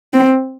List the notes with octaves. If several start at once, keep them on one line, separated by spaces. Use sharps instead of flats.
C4